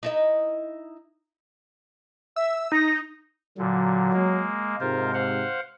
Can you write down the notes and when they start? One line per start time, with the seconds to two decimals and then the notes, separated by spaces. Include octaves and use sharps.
0.03 D#4 E4 D#5
2.36 E5 E6
2.72 D#4 A#6
3.58 A#2 D3 F#3
4.13 G#3 A#3
4.80 G#2 C3 F4 A#4 C5
5.14 C5 F5 F#5